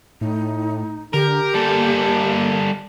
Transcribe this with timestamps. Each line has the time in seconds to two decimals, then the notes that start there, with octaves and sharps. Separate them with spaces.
0.21 A2 D#4
1.14 D3 G4 A#4
1.55 G3 A#3 A4